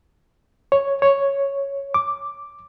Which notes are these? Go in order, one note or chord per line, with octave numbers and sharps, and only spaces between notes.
C#5
C#5
D6